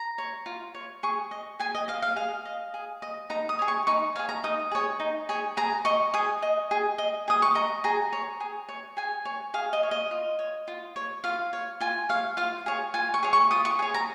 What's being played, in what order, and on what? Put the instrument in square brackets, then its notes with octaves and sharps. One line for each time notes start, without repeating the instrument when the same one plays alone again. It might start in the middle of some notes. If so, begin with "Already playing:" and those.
Already playing: [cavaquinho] A#5
C#5
F4
C#5
G#4 C#6
D#5
G#4 G#5
D#5
D#5 F5
F5
G#4 F5
D#5
G#4
D#5
D#4 A#5
D#6
G#4 C#5
C#6
D#4 C#6
G#4 C#5 F5
A#5
D#4 D#6
G#4 C#5
D#4
G#4 C#5
G#4 A#5
D#5 C#6
G#4 D#6
D#5
G#4
D#5
G#4 D#6
C#6
D#5 A#5
G#4 A#5
C#5
G#4
C#5
G#4 G#5
C#5
G#4 F5
D#5
C#5
D#5
F4
C#5
F4
C#5
F4 F5
C#5
F4 G#5
C#5 F5
F4 F5
G#4 C#5
F4 G#5
C#6
G#4 C#5
C#6
F4 D#6
C#6
G#4 C#5
A#5